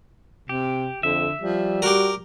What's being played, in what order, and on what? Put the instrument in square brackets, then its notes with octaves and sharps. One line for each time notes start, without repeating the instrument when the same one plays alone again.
[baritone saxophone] C3 [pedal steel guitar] G4
[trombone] F2 [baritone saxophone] D3 [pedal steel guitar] E5
[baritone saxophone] F3 [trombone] G3
[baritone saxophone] F#4 [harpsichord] G4 A#4